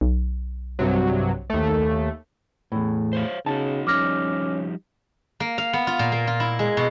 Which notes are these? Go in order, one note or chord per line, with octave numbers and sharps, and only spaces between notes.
B1
G2 C3 F#3
D#2 A3
E2 A2
C5 C#5 F5
C#3 D#4 E4 F#4 A5
F3 G3 C#4 D#4 D6 F6 A#6
A#3
F5
B3
F4
A#2
A#3
F4
E4
G#3
B2